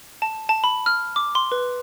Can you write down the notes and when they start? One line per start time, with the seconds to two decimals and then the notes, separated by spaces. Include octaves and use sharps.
0.22 A5
0.49 A5
0.64 B5
0.86 F6
1.16 D6
1.35 C6
1.52 B4